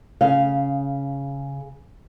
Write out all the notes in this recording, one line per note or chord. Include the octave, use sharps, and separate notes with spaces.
C#3 F5